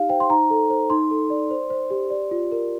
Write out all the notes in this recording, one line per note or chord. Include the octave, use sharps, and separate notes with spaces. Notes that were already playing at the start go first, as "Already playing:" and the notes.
Already playing: D#4 G4 F5
C5 G5
C6
D#4 A#5
A4
C5
D#4 C6
A4
D5
C5
C5
G4
D5
F4
A#4